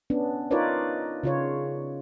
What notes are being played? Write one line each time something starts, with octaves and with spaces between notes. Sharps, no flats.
B3 C#4 D4
D#4 F4 A#4 B4 C#5 D5
C#3 F4 C#5